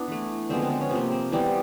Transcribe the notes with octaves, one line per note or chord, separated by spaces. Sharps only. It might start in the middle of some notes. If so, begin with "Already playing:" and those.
Already playing: B3 D4 E4
E3 A3
D3 F3 G#3 B3 C4
C4
B3
C#4
C3 F3 A#3 C4
C4
E3 G3 B3 C4